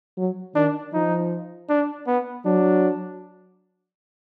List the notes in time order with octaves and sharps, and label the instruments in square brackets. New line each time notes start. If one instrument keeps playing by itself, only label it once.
[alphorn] F#3
[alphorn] D#3 [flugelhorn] D4
[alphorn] F3 [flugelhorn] D#4
[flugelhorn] D4
B3
[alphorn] F#3 [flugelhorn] D4